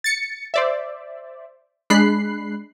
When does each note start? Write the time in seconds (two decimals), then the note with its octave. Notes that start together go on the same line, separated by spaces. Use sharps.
0.04 A6 C#7
0.54 C5 D5 E5
1.90 G#3 D4 B5 F#6 C7